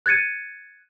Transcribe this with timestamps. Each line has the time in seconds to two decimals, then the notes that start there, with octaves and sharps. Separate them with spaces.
0.06 F#6 G#6 A6 C#7 D#7